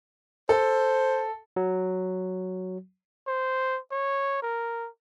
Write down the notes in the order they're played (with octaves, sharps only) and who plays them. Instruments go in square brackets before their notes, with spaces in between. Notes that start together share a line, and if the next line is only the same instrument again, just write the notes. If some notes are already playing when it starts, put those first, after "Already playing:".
[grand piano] A4 [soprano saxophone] C5
[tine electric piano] F#3
[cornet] C5
C#5
A#4